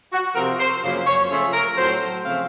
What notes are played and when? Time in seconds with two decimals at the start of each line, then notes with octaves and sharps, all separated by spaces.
0.13 F#4
0.35 C3 F3 C4 A#4
0.59 C5
0.83 F#2 C#3 F3 A#3 C5
1.07 C#5
1.30 C#3 F3 A3 C#4 C5
1.53 A#4
1.77 A2 F#3 C4 C5
2.25 C#3 F3 A3 C4 F5